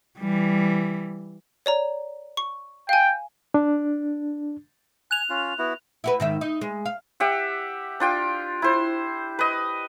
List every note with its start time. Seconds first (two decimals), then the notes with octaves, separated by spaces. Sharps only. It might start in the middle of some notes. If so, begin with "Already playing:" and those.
0.19 E3 G3
1.66 C#5 D5 A#5
2.37 C#6
2.89 F5 G5 G#5
3.54 D4
5.11 G#5 F#6 F7
5.30 C#4 F4
5.59 B3 E4 F#4
6.04 E4 F#4 B4
6.20 G#2 D#3 E5
6.41 D#4
6.61 G#3
6.85 F5
7.20 G4 E5 F#5
8.00 D4 F4 G5
8.62 E4 C5
9.39 B4 D#5